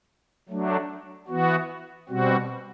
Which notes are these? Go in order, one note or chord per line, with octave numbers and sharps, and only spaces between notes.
F#3 A3 D4
E3 B3 F#4
B2 G3 C4 F#4